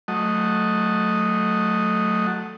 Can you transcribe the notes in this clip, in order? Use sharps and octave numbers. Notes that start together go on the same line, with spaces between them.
F#3 A3 D#5